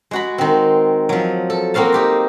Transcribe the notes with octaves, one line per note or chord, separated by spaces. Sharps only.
G#3 F#4 B5
D#3 C4
F3 F#3
A4
A#3 C4 F#4 F5 A5
D#4 G4 C5